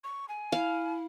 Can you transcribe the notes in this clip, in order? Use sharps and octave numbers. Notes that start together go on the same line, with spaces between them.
C#6
G#5
E4 F5